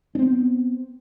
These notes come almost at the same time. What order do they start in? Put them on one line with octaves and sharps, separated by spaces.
D4 C4 B3